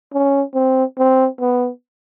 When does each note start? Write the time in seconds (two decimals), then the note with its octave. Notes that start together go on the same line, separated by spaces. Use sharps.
0.13 C#4
0.55 C4
0.98 C4
1.39 B3